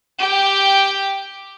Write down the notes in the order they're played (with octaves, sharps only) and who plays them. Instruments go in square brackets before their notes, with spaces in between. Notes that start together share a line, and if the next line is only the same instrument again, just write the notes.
[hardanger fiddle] G4 G5